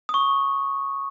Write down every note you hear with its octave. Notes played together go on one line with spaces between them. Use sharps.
D#6
C#6